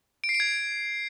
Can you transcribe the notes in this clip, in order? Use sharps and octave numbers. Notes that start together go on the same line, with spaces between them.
D7
C7
D7
G#6